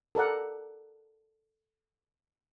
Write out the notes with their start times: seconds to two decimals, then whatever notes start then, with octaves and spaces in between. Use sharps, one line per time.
0.15 A4 A#4 D5 F#5